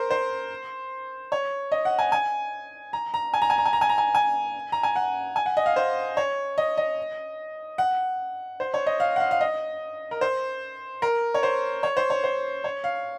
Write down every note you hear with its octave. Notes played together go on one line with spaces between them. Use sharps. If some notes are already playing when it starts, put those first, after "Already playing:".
Already playing: A#4 C5
C5
C#5
D#5
F#5
G#5
G#5
A#5
A#5
G#5
A#5
G#5
A#5
G#5
A#5
G#5
A#5
G#5
G#5
A#5
G#5
F#5
G#5
F#5
D#5
F5
C5
C#5
D#5
D#5
F#5
C5
C#5
D#5
F5
F#5
F5
F5
D#5
A#4
C5
A#4
C#5
C5
C#5
C5
C#5
C5
C#5
F5